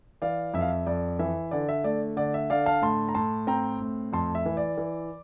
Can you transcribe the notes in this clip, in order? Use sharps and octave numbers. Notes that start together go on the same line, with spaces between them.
E3 D5 F5
F2 E5
F5
E5
F2 D5
E3 E5
D3 D5
E5
A3 D5
D3 D5
E5
D3 D5 F5
F5 A5
A2 A5 C6
A#5
A2 A5 C6
C4 G5 A#5
A2
F2 A5 C6
E5
E3
D5
E3